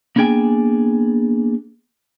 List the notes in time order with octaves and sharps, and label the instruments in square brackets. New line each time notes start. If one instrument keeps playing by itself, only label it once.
[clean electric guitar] A#3 B3 D4 G#4 G5 G#5